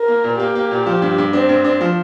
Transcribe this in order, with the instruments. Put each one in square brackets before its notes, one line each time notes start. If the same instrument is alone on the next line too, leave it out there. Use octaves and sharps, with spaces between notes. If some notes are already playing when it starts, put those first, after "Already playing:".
Already playing: [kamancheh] A#4
[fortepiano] A#3
A#2
[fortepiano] A#3 [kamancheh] G4
[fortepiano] A#3
A#2
F3
G2
G2
[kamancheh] C4 [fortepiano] D4
[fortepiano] G2
D4
F3